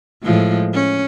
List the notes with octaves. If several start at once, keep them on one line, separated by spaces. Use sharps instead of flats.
A2 F3 G#3
C#4